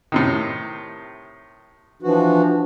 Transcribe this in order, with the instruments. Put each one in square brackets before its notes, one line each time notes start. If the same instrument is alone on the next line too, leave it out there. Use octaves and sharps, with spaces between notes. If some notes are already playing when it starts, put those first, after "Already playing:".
[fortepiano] A2 C3 D#3
[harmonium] E3 F3 F#4 [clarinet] D4